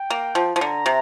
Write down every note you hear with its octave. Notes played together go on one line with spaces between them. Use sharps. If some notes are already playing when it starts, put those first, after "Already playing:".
Already playing: G5
A#3
F3
F3
D3 A#5
C3